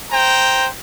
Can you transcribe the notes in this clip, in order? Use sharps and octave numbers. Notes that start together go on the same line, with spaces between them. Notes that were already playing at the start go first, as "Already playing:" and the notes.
C5 G5 A#5